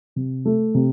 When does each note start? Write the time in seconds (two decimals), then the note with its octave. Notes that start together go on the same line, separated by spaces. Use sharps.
0.16 C3
0.46 A3
0.75 C3